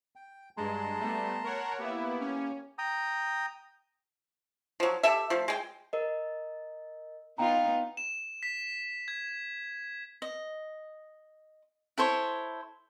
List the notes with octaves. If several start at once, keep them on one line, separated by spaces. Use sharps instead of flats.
G5
G2 G#3 A5 A#5 C6
G3 A3 B3
A#4 C#5 F#5
A#3 B3 E4 G4
C#4
G5 A#5 D#6
F3 F#3
G4 A4 E5
F3 A3
G#3 G5
A#4 D#5
B3 D#4 F4 F5 G5 A#5
E7
B6
G#6
D#5
E4 A4 C5 C#5